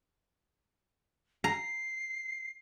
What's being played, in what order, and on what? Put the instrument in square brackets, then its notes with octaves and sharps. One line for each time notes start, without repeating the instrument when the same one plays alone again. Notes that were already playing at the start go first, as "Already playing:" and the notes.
[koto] A#5 [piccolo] C7